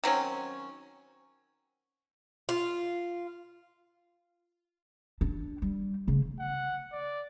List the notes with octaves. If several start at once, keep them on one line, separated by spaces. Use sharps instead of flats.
D#3 F#3 C4 C#4
F4
D4
G3
C#3 A3
F#5
D5